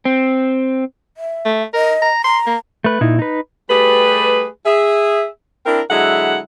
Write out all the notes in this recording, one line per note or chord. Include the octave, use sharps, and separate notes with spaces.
C4
E5
A3
A#4 D#5
A#5
A#5 C6
A#3
A3 B4
A#2 D#4 E4
D#4 B4
G3 A3 G4 G#4 B4
G#4 E5
C4 D4 E4 A#4
D3 F#3 G#3 E4 E5 F#5